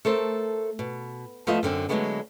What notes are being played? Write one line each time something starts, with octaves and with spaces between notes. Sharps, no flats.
A3 A4 A#4 C5
B2
F3 A3 B3 F4 D#5 E5
F#2 D3 C4
D3 F#3 G#3 A3 B3 D4